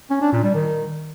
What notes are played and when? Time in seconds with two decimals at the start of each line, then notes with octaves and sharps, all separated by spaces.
0.10 C#4
0.21 D4
0.32 A#2
0.43 G3
0.54 D#3